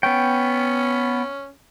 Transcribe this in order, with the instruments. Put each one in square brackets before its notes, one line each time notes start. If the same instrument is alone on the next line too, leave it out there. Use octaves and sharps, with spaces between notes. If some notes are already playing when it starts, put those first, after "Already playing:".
[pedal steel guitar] B3 G5 [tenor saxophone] C#4